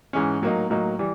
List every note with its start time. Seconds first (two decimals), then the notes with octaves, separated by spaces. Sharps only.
0.13 G#2 E3 G#3 C#4
0.42 A2 F#3 A#3 D#4
0.70 A2 F#3 A#3 D#4
0.99 E3 G3